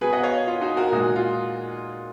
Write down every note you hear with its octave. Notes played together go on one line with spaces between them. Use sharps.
B2 F#3 G#4 B4
D#5 F#5
C#5 F5
F4
D#4 F#4
F#4 A#4
A#2 G#3 D#4 F#4
F4